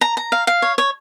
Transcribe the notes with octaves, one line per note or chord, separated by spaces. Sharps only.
A#5
A#5
F5
F5
C#5
C#5